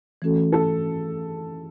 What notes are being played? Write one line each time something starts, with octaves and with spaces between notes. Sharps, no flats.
E3 A3 C#4 F#4 A4
A4